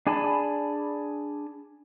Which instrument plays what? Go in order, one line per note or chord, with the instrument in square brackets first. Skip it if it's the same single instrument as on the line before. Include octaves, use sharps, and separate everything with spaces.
[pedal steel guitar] D4 G#4 G#5 A5 B5